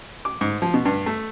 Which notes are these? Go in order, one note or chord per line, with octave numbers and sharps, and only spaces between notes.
D6
G#2
F3
B2
G2
A3